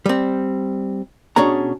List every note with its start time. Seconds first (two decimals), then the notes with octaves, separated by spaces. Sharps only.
0.06 G3 C4
1.36 B2 C#4 D4 G#4 C#5 A#5